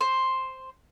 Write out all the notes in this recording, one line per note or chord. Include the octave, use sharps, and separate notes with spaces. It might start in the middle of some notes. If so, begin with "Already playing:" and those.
C5